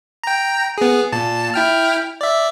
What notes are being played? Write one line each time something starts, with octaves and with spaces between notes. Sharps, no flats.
G5 A#5
B3 G#4
A#2 A5
E4 G5 F6
D5 E5